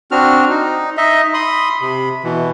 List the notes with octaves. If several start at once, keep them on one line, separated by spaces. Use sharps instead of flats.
C4 D4 F#4 F6
D#4
D#4 D#5 E5
B5 C6 D#6
C3 B5
B2 E3